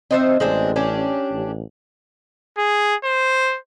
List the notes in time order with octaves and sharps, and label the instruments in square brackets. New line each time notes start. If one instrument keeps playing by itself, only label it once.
[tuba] C4 [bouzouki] D#4 C5 E5
[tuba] A1 [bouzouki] G#3 C4 D4
[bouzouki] C#4 D4 G4
[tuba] A1
[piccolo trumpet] G#4
C5